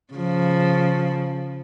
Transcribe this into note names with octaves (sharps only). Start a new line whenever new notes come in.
C#3 F3